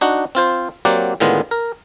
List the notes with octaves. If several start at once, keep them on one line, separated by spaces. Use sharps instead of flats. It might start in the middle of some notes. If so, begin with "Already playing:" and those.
D4 D#4 F#4 F#5
C4 F4 C5
F#3 A#3 C4 G4 D5 F#5
A2 D3 D#3 G#3 B3 F4
A#4